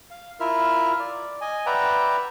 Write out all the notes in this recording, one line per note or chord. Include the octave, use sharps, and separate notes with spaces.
F5
E4 F4 A#4 E5 F6
D5
D#5 G#5
B4 D5 E5 F#5 G5 A#5